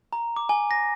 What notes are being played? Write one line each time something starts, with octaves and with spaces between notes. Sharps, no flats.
A#5
D6
G#5
A#6